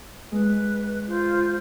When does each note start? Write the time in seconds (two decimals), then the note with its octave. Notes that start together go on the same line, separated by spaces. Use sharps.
0.32 G#3 B4
1.08 F4 C5